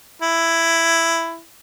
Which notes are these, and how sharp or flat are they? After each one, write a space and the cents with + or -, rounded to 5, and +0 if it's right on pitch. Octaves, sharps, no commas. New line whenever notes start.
E4 +10